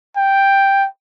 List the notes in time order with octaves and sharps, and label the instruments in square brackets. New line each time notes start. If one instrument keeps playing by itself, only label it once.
[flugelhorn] G5